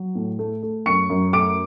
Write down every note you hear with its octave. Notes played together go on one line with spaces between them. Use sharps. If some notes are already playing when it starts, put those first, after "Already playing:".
Already playing: F#3
A2
A3
A3
F#2 C#6 C#7
F#2
A3 D6 D7